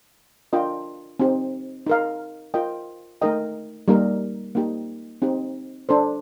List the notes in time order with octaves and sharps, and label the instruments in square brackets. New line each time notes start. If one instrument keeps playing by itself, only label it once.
[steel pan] D4 F4 A#4 D#5 G5
C4 D#4 G4
D#4 A#4 F5
F4 A#4 D#5 G5
A3 D#4 A#4 D#5 G5
G3 A#3 D#4 A#4
A#3 D#4 G4
C4 D#4 G4
D4 A4 C5